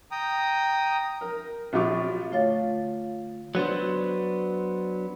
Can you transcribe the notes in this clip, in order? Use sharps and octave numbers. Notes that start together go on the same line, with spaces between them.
G5 A#5 D#6
A#4
A#1 F#3 F4 C#6 D6
D3 A3 F4 C#5 F5 A6
F#3 B3 D4 C5